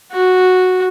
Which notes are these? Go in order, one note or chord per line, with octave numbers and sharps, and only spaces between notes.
F#4